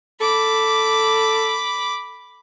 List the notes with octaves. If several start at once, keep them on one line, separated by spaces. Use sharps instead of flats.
A4 B5 D6